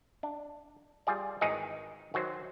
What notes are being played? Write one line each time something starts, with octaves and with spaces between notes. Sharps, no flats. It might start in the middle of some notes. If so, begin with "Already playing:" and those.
D4
G3 F4 G#4 D5
G#1 D#3 E3 D#4 G#4 D#5
D#3 F#3 F#4 C5